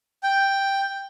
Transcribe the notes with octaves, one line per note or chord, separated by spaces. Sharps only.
G5